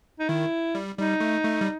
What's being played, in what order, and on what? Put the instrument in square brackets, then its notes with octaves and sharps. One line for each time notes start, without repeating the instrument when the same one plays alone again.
[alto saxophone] D#4
[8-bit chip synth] D#3 [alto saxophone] E4
[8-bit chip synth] G3
[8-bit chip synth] G3 [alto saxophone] D#4
[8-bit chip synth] A3
A3
G3